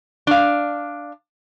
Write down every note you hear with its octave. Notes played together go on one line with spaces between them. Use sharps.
D4 F5